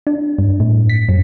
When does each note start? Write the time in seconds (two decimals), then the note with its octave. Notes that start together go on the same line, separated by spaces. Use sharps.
0.07 D4
0.38 G2
0.60 A2
0.89 B6
1.09 F#2